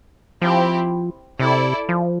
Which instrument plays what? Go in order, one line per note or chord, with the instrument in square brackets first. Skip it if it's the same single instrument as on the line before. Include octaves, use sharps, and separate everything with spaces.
[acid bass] F3 [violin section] C4 E4 G4
[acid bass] C3 [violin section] E4 A4 D5
[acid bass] F3